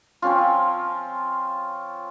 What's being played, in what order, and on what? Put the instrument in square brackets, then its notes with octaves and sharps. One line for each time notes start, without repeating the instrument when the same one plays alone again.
[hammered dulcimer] F3 C4 C#4 F4